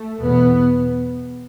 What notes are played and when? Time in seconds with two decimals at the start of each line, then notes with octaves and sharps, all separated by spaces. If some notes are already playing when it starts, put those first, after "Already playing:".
Already playing: A3
0.22 E2 B2 B3